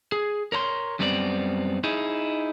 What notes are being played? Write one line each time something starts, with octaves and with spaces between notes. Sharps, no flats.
G#4
A#4 C#5 A#5 C6
F#2 G3 B3 C4 E4 D5
D#4 E4 G#4